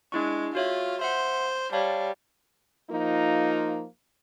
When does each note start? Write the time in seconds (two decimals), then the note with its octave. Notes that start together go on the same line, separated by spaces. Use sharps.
0.12 G#3 D4 E4 C#6
0.55 F4 F#4 C#5 E5
1.01 C5 E5 F#5
1.73 G3 C#5 F5 A5
2.90 F3 A#3 D#4 F4